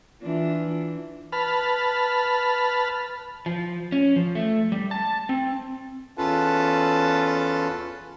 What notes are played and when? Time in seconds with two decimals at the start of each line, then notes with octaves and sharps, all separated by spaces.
0.21 E3 D4 F4
1.32 B4 A5 B5 F6
3.46 F3
3.92 C#4
4.16 F3
4.35 A3
4.72 G3
4.91 A5
5.29 C4
6.18 E2 C#4 F4 A4 B4 A5